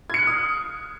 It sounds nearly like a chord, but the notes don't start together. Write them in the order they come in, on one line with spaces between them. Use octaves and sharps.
G#6 C#7 F#6 F6 D#6